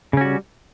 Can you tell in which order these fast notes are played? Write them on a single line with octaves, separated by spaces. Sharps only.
C#3 C#4 F#4 G3